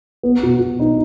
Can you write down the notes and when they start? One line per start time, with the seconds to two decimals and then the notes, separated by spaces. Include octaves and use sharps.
0.23 B3
0.43 B2
0.60 B2
0.80 D#4